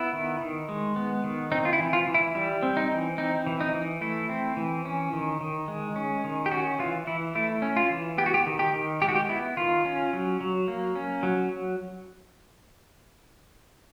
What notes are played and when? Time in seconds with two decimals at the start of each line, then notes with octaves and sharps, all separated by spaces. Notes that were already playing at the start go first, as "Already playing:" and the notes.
Already playing: B3 E4
0.13 D#3
0.41 D#3
0.69 G#3
0.96 B3
1.24 D#3
1.52 C4 D#4
1.65 F4
1.73 E4
1.79 E3
1.93 F4
2.07 E3
2.14 E4
2.35 G3 E4
2.63 C4
2.77 D#4
2.91 E3
3.18 C4 D#4
3.47 E3
3.60 D#4
3.74 E3
4.01 A3 E4
4.29 C4
4.57 E3
4.85 C#4
5.13 D#3
5.41 D#3
5.68 G#3
5.96 C#4
6.24 D#3
6.46 G4
6.51 C#4 F#4
6.79 E3 F4
7.07 E3 E4
7.35 A3 E4
7.62 C#4
7.77 F4
7.90 E3
8.18 B3 G4
8.26 F#4
8.34 G4
8.47 D#3
8.59 G4
8.73 D#3
9.02 G#3 G4
9.08 F#4
9.15 G4
9.29 B3 E4
9.57 D#3 F4
9.85 C#4
10.13 F#3
10.41 F#3
10.68 A#3
10.95 C#4
11.23 F#3